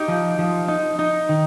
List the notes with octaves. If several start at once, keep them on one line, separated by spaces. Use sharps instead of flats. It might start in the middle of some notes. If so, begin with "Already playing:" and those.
Already playing: D#4 G4
F3
F3
D#4
D#4
D#3